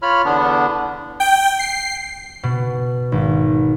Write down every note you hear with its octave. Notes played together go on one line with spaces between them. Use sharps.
F4 C#5 B5 F6
E2 D3 B3 D4
G5
C7
B2
G#1